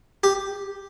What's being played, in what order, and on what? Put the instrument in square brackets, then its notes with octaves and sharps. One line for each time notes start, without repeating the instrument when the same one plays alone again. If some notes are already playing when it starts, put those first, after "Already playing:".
[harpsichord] G4